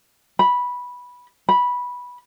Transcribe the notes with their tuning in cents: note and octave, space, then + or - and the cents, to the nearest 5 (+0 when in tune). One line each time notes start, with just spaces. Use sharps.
B5 -10
B5 -10